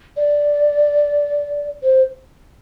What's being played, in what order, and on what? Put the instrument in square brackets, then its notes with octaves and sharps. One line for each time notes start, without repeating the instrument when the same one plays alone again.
[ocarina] D5
C5